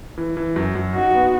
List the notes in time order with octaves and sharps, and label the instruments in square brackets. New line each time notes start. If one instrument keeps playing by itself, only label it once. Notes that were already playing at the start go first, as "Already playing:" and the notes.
[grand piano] E3
E3
F#2
F#2
[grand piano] D#4 [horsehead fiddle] F#4
[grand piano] B3